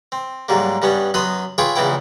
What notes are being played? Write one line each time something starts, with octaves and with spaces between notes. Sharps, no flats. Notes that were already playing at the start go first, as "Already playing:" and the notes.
C4
G#2 F#3 G3 A#3
G2 G3 B3 C#4
F#2 F#3 B3 B4 C6 D#6
F4 G#4 B4 C#5 E5 G5
A#1 C#3 E3 B3 E4 G5